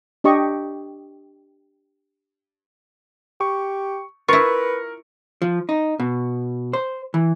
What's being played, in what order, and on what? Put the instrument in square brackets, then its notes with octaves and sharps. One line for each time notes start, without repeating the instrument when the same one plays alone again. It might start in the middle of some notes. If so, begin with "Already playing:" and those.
[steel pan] D4 G4 D#5 C#6
[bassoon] G4 [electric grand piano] C#6
[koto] E4 F4 [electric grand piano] A#4 C#7 [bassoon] B4 [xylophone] C#6
[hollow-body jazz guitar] F3
D#4
B2
C5
E3